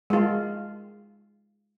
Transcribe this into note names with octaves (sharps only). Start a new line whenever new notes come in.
G#3 F4